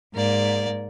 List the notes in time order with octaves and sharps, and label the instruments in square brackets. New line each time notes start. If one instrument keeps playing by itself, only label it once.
[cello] G#2 [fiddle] A#3 D5